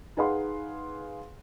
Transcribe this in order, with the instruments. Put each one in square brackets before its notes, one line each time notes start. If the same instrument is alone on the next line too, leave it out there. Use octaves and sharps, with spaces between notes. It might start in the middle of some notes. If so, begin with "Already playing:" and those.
[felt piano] D#4 G#4 B4 F5 F#5 C6